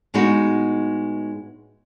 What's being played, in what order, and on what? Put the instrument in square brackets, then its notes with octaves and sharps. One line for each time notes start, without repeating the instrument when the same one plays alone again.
[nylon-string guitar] A2 G#3 B3 D#4 F#4